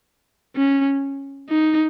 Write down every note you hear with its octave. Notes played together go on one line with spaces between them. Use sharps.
C#4
D#4